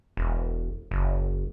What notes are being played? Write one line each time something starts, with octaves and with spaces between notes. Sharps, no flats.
E1
F#1